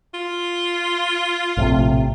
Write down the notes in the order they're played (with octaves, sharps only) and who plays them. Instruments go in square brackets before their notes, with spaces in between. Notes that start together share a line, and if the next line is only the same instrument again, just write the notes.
[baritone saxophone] F4
[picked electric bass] A#1 A2 C3